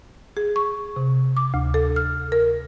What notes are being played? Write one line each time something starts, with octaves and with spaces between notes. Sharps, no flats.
G#4
C#6
C3
D6
D2
A4
F6
A#4